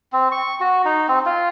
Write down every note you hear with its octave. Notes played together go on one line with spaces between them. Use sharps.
C4
C#6
F#4
D#4
C4
F4